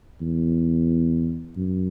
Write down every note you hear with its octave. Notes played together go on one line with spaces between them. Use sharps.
E2
F#2